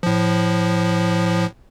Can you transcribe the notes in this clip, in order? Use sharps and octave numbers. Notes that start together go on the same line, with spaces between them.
A2 F3